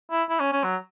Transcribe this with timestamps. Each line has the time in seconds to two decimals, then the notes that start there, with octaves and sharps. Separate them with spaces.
0.11 E4
0.30 E4
0.40 C#4
0.53 C#4
0.64 F#3